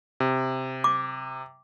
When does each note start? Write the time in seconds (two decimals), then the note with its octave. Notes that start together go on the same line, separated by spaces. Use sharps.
0.20 C3
0.84 D6